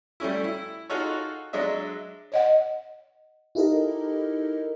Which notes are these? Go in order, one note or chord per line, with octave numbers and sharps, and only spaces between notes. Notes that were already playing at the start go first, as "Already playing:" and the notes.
G3 A3 C#4 E4
E4
D#4 F4 F#4 G#4 A4 C#5
F#3 G#3 D4 D#5 E5
C#5 D#5 F#5
D#4 E4 G4 A4 A#4 D#5